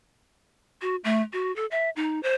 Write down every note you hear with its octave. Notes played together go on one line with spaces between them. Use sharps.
F#4
A3
F#4
A4
E5
D#4
C5